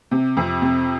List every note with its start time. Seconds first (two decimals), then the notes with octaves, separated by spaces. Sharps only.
0.11 C3
0.37 F2
0.62 C3